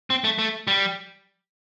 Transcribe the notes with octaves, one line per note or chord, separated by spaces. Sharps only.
C4
A3
A3
G3